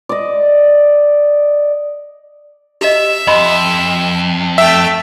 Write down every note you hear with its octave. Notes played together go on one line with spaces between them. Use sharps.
D5 D#5
G4 D#5 E5
F2 D#5 B5 C6
A3 E5 G5